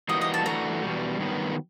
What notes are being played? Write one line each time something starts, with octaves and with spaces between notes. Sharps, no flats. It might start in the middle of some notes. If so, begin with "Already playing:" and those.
E3 G3 A#3 D#4 F#4 D#5
D#5
A5
E3 A3 D4 F#4 A#5
E2 B2 G3
G2 D#3 F#3 B3